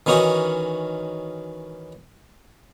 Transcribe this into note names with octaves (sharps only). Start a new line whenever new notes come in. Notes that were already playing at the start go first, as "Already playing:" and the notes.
D#3 E3 C#4 D#4 F#4